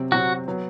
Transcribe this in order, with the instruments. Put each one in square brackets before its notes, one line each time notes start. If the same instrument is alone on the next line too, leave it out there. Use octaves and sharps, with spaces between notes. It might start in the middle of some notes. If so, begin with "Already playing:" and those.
Already playing: [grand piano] C3 F#3 C4
[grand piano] C3 F#3 C4 [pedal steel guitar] F#4
[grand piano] F#3 B3